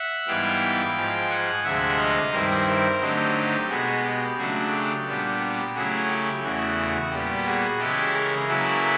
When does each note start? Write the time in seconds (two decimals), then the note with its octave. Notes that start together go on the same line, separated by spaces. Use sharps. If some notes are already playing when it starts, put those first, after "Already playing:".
Already playing: E5 F#5
0.27 G#2 E3 G3 B3 E4 F5 G5
0.96 G#2 F3 G#3
1.30 F#5 G#5
1.64 D2 C3 F3 G#3 E5 F#5
1.98 D#5 F5
2.32 G2 D#3 G3 C4 E4 A#4 C5
2.67 A#4 C5
3.01 D3 F#3 A3 C4 D#4 G4
3.35 G4
3.69 B2 G#3 B3 F#4 G#4
4.04 G4
4.38 C#3 F#3 A3 D4 F#4 G#4
4.72 G4
5.06 A#2 G3 B3 D4
5.40 G4
5.74 C#3 F#3 A3 C#4 E4 F#4 G#4
6.09 G4
6.43 E2 C#3 E3 A3 F#4
7.11 A#2 G3 B3 G4
7.45 F#4 G#4
7.79 C#3 E3 G#3 C#4 E4 G4 A4
8.14 G#4 A#4
8.48 C#3 F#3 A#3 C#4 E4 A4 B4